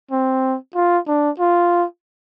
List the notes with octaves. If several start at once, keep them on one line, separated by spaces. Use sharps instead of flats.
C4
F4
D4
F4